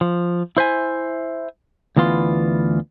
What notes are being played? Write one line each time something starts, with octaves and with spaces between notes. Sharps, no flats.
F3
E4 C5 E5 G#5
D2 E3 B3 F4 C6